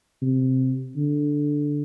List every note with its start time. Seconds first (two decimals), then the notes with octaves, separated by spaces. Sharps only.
0.22 C3
0.96 D3